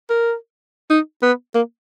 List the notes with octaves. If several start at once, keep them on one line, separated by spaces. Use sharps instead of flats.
A#4
D#4
B3
A#3